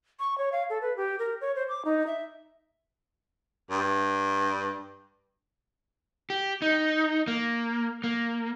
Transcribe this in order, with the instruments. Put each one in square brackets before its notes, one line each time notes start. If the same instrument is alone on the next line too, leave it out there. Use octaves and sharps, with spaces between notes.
[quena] C#6
C#5
F5
A4
B4
G4
A#4
C#5
C5
D6
D#4
E5
[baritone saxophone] G2
[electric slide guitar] G4
D#4
A#3
A#3